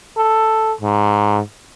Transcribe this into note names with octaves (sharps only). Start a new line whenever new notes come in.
A4
G#2